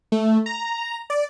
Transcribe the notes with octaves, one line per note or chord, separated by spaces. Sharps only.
A3
A#5
D5